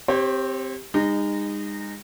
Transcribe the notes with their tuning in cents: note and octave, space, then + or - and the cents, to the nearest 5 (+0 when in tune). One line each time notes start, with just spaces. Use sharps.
C4 +0 G4 +0 C#5 -40
G#3 -40 D#4 -20